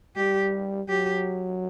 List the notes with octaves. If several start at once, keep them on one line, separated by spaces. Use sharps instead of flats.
G3 G4
F#3 G4